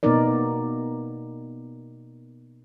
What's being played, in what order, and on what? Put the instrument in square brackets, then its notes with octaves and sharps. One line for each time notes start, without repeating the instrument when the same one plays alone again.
[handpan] B2 A#3 B3 D#4 A#4 D5